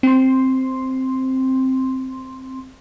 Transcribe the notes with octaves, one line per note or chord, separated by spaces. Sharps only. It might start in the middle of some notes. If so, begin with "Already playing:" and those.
C4 C6